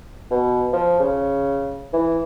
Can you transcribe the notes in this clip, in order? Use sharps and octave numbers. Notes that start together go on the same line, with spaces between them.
B2
F3
C#3
E3